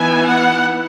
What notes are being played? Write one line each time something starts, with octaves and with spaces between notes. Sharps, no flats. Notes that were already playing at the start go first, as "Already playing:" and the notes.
Already playing: E3 B3 D#4 G#5
F#5